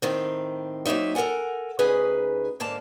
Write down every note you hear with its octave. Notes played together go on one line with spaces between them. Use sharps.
A2 D#3 C4
F#3 A#3 C4 D#4 E5
A4 A#4 D5 F#5 G#5
D2 C#4 D#4 G#4 B4
G#2 D3 A#3 A5